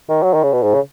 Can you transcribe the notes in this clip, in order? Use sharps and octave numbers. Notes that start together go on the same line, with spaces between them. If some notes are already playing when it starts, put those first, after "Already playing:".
D#3
F#3
D#3
C#3
B2
G#2
C#3